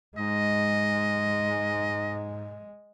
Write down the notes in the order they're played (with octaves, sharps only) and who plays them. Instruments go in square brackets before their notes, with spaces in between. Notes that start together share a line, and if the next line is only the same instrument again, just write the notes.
[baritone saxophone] G#2 [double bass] G#3 [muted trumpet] D#5